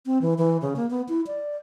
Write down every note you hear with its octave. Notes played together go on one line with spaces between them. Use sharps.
C4
E3
E3
C#3
A#3
B3
E4
D5